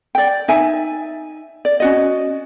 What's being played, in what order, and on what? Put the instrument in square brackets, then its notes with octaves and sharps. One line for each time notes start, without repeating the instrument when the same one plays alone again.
[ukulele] D5 G5
D#4 E5 G#5
D5
C#4 F#4 D#5